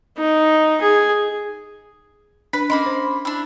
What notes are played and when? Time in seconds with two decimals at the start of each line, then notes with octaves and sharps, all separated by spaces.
0.18 D#4
0.81 G#4
2.53 D4 B4
2.70 A#3 C#4 D#5 B5 C6
2.86 C5
3.25 D4 E4